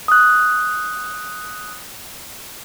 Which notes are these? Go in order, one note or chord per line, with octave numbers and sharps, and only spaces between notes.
D#6 F#6